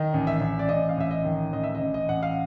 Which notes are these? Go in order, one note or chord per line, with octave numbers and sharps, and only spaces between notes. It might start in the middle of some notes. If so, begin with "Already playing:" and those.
Already playing: D#3 D#5
A1
E5
A1
D5
A1 D#5
F5
A1 E5
D#5
D#3
A1 D#5
E5
D#5
A1
D#5
A1 F#5
F5